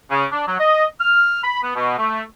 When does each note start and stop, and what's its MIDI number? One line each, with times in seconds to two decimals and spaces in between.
0.11 0.25 49
0.32 0.46 62
0.48 0.55 54
0.60 0.85 75
1.00 1.42 89
1.44 1.62 83
1.63 1.72 59
1.76 1.95 47
1.98 2.22 57